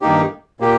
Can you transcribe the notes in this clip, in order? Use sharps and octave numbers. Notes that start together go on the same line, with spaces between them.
G2 D#3 A#3 D#4 G4
A#2 A#3 G4